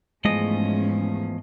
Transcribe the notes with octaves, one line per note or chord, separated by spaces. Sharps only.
E2 G#2 F3 G#3 A3 C#4 D#5